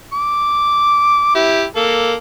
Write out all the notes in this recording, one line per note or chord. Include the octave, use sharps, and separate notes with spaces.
D6
E4 G4
A#3 A4